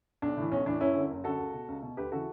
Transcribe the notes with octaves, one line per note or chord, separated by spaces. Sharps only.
B1 D4
A2 E3
B1 C#4
A2 E3 D4
F#1 C#4 E4
F#2 D3
F#1
F#2 D3 F#4 A4
C#2
B2
C#2
B2
D2 G4 B4
C#3 E3 F#4 A4